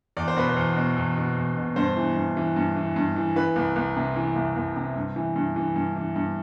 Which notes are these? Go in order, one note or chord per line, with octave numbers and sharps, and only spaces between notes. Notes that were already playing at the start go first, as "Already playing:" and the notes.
E2 D5
C5
B2 B4
C5
E2
B2
E2
B2
E2
B2
G2 C5
E3
G2
E3
G2
E3
G2
E3
E3 B4
C2
C2
C3
E3
C2
C2
C3
G2
E3
G2
E3
G2
E3
G2